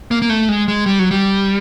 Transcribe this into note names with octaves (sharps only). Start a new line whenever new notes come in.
A#3
A#3
A3
G#3
G#3
G3
F#3
G3